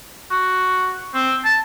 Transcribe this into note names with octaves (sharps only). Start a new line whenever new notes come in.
F#4
C4
A5